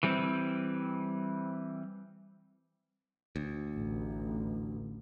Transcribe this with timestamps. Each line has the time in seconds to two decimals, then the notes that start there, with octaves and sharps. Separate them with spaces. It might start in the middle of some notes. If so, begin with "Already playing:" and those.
0.03 E3 G3 C4
3.36 D2
3.75 A1